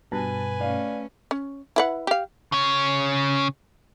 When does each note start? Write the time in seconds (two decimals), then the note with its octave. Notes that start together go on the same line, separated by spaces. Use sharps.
0.12 G2 B2 B4 G#5 A5
0.60 A3 C#4 D5 F5
1.31 C#4
1.76 E4 B4 F#5
2.07 G4 F5
2.52 C#3 C#4